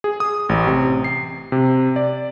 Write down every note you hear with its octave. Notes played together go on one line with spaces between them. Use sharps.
G#4
D#6
A1
C3
C7
C3
D5